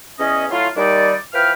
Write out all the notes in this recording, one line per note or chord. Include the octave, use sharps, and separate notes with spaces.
E2 C#4 D#5
F#3 A3 E4 F4
D#2 D#3 G3 D#4 D5
E3 F3 B4 G5 F6